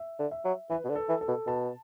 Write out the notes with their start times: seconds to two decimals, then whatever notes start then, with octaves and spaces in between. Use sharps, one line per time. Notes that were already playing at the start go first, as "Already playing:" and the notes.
Already playing: E5
0.19 D3
0.31 E5
0.45 F#3
0.70 E3 B4
0.84 B2
0.89 D3
0.95 A4
1.09 E3
1.21 A4
1.28 B2
1.47 B2 A5